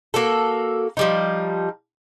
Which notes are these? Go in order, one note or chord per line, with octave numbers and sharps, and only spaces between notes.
A#3 F#4 A4
F3 G3 D#4